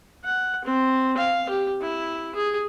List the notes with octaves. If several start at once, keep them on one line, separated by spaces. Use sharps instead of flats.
F#5
C4
F5
G4
E4
G#4